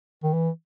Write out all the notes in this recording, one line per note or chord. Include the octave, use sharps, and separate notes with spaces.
D#3
E3